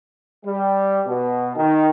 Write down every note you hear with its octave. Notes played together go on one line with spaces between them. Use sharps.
G3
B2
D#3